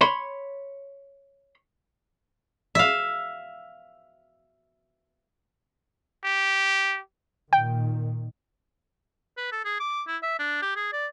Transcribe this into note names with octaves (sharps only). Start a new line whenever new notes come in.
C#5 B5 C6
E5 F5
G4
A#2 D#3 G5
B4
A4
G#4
D6
E4
E5
D4
G4
G#4
D5